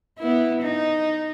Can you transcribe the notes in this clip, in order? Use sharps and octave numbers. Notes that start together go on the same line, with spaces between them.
B3 E4
D#4